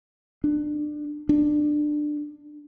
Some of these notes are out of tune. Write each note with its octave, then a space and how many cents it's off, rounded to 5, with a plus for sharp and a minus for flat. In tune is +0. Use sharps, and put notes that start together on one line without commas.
D4 +25
D4 +20